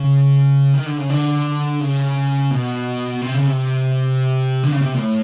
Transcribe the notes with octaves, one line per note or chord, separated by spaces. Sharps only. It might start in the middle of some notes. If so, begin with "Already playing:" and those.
Already playing: C#3
D#3
D3
C#3
D3
C#3
B2
C3
C#3
C3
D3
C#3
C3
A#2
A2